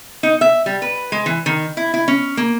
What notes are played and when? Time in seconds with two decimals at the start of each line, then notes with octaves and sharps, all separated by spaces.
0.23 D#4
0.41 E5
0.66 G3
0.82 B4
1.12 G#3
1.26 E3
1.46 D#3
1.77 E4
1.94 E4
2.08 C#4
2.37 A#3